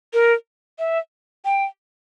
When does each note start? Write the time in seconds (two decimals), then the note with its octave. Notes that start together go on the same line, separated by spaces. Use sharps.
0.14 A#4
0.79 E5
1.45 G5